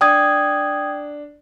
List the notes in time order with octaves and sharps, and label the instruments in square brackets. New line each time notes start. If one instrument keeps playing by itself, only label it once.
[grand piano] D4 [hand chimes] G5 D#6 G#6